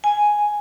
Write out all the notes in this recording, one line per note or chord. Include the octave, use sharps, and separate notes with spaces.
G#5